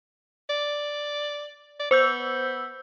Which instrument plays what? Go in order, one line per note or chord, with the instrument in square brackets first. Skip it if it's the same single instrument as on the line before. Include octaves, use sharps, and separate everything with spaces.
[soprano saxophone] D5
D5
[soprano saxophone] B3 [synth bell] C5 E6 G6